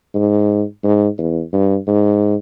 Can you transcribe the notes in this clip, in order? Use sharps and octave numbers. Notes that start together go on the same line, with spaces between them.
G#2
G#2
E2
G2
G#2